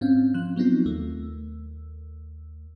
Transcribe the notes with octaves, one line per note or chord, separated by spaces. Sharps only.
G#2 C4 C#4 F5
F3 F#6
F#3 B3 C4 D#4 F4
D#2 A3